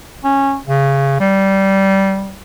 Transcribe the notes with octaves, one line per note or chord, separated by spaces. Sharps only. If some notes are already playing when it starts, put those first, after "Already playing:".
C#4
C#3
G3